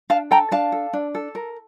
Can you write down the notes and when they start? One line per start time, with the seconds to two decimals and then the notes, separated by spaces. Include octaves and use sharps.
0.10 D4 F5 A5
0.31 A4 G5 A#5
0.51 D4 F5 A5
0.72 A4
0.93 D4
1.15 A4
1.35 A#4